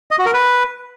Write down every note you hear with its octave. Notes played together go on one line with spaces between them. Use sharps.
D#5
F#4
A#4
B4